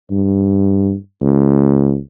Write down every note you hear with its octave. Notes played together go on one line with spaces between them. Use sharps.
G2
C#2